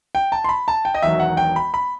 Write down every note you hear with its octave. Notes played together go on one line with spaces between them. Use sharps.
G5
A5
C6
B5
A5
G5
D#5
E1 E2 D#3 F#3 E5
F#5
G5
B5
B5